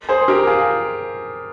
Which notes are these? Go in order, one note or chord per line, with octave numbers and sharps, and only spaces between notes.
G#4 C5
G4 A#4
F4 G#4